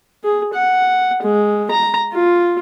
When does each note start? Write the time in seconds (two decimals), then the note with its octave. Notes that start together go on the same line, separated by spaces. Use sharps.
0.24 G#4
0.54 F#5
1.23 G#3
1.71 A#5
2.13 F4